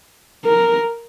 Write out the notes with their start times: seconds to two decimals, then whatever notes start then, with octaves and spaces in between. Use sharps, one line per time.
0.45 A#4